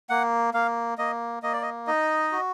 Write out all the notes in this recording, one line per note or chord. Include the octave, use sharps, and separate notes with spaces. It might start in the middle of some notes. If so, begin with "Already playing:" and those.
A#3 F#5
A#3 F5
A#3 D#5
A#3 D#5
D5
D#5
D#4 D#5
F#4